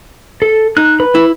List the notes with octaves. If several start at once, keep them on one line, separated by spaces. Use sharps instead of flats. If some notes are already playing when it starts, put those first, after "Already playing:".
A4
D#4 F#6
B4
E4